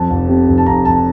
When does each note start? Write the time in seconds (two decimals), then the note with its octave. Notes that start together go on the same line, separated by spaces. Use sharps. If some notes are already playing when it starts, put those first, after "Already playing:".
Already playing: F2 A5
0.10 F1
0.28 C3
0.48 F1
0.58 A5
0.66 F1 A#5
0.85 F1 A5